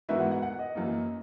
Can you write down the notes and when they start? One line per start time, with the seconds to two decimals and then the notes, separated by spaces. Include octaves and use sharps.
0.09 G#2 E3 B3 F#4 A#4 E5
0.20 F#5
0.32 F#5
0.42 F#5
0.59 D#5
0.75 F#2 E3 A#3